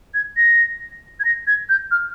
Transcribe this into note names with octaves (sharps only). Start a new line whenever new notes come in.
G#6
A#6
G#6
A#6
G#6
G6
F6